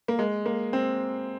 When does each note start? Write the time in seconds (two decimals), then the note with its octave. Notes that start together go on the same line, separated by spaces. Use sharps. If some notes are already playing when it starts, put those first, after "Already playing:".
0.08 A#3
0.19 G#3
0.46 A#3
0.73 C4